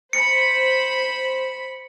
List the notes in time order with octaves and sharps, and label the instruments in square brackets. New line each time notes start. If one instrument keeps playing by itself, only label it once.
[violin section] C5 B5 [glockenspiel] C#7